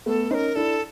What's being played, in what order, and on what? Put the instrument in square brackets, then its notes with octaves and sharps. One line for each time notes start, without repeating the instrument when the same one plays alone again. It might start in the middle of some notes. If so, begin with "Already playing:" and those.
[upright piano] A3 B3 [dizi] A4
[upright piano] C#4 D#4 [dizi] C5
[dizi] A#4
[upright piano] D4 E4 [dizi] A4